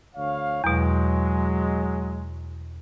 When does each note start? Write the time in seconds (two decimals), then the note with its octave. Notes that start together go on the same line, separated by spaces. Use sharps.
0.16 D2 C#5 F5
0.64 E2 B2 F#3 G#3